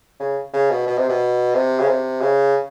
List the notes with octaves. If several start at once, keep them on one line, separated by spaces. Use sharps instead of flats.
C#3
C#3
B2
B2
C3
B2
C3
C#3
C3
C#3